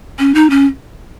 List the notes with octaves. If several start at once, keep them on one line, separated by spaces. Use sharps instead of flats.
C#4
D#4
C#4